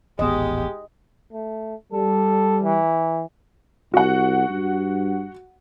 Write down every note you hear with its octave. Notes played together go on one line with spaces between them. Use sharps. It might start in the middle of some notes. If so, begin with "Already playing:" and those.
D#1 A1 G#3 B3 G4 D#5
A3
G3 A4
E3
C2 F#4 F#5
G2